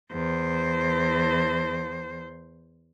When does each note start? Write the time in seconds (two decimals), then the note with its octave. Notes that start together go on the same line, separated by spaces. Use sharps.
0.12 E2 C5